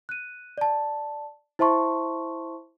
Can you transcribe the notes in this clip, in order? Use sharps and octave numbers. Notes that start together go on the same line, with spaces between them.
F#6 D#7
D5 A5
E4 C5 E5 A5 C6 C#6